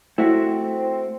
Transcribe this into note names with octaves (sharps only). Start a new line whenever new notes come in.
A3 C4 E4 F#4